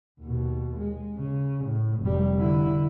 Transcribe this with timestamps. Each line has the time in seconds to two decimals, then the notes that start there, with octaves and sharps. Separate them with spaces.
0.20 D#2 B2
0.78 G#3
1.16 C#3
1.66 A2
2.00 F1 G3
2.38 D3 E4